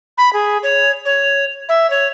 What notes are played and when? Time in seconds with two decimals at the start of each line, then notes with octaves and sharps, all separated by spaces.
0.18 B5
0.33 G#4
0.63 C#5
1.05 C#5
1.69 E5
1.90 C#5